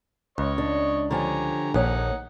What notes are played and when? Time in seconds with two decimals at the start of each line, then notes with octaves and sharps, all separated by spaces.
0.38 C#2 C#5 D#5 C#6
0.58 D4
1.11 D3 F3 G4 C#5 G#5 A#5
1.74 A#1 D#2 D#4 C#5 F#5